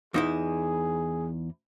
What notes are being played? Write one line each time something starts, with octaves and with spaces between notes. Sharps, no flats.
E2 D#4 E4 G#4